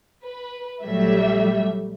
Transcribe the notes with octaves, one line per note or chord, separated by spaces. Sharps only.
B4
A#1 F#3 G3 A3 E5